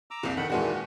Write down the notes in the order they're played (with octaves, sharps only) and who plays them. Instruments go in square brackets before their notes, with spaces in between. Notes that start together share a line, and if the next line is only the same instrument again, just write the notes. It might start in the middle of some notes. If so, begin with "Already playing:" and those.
[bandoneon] A#5 D6 E6
[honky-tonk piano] F#1 C2
[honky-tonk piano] D#3 [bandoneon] A4 F#5 B5
[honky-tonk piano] D#2 G#3 F#4 [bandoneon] A#2 D#3 E3